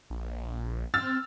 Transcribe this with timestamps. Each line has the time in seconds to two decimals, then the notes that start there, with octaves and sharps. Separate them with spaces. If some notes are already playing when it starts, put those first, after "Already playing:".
0.10 A#1
0.94 C4 E6 F6 A6